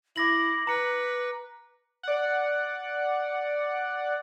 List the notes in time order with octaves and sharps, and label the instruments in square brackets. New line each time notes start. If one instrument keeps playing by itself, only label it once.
[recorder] E4 [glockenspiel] D6 A#6 F#7
[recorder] B4 [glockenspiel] A#5 C#7
[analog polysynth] D5 F#5